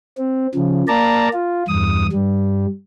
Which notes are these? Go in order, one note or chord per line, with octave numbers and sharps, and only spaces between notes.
C4
C#3 F3
A#3 D5 A5 A#5
F4
E2 G2 D#6
G2 G3